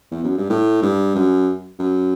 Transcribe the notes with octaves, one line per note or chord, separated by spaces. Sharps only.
E2
F#2
G2
A2
G2
F#2
F#2